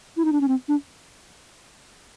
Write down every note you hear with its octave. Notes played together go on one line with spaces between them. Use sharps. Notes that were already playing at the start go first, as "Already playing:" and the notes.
E4
D#4
D4
C#4
C4
D4